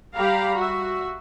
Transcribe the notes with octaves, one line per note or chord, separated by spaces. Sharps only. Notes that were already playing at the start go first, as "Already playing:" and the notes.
G3 G4 F5 A#5 B5
F#4 E5